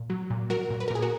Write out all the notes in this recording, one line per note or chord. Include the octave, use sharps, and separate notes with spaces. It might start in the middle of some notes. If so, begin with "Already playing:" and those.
Already playing: A#2
F#3
A#2
F#3 F#4 A#4
A#2
B4
A#4
A#2 G#4
F#4 A#4